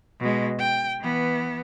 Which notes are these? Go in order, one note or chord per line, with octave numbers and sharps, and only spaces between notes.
B2 G#3
G5
E3 B3